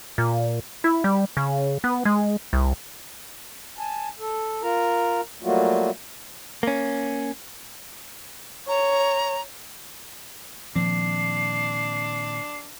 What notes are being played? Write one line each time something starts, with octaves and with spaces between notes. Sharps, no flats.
A#2
E4
G3
C#3
B3
G#3
C2
G#5 A5
A4
F4 A#4 A#5
F#3 G3 A3 A#3 F4 F#4
A#3 C#4
C#5 A#5
A#2 D#3 F3 C4 D4 C7